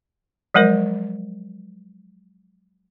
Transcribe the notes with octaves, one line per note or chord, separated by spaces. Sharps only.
F3 F#3 G#3 A#4 C5